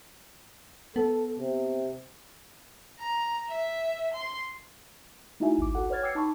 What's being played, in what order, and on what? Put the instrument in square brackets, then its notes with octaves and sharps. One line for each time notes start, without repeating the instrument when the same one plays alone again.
[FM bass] B3 [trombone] A4
[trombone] C3
[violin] A#5
E5
C6
[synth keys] A3 D#4 E4 F#4 E5 G#5
G#1 C#2 D6
F#4 A4 F#5
B4 C#5 F#5 F6 G#6 A6
G5 D6 E6 G#6 C7 C#7
D#4 A5 B5 C#6